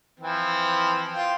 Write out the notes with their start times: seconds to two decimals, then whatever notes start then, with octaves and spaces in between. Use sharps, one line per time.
0.20 E3 F3 C4
1.14 F4 G5